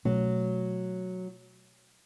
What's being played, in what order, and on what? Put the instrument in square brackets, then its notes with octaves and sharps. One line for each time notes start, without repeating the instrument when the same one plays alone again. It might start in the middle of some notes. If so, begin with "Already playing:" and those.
[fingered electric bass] B2 A3 C#4 [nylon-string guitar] F#3